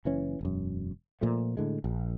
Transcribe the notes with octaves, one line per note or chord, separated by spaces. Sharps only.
F#1 E3 C#4
E1 F#2
A#2 F3 A3
A2 D3 G#3
A#1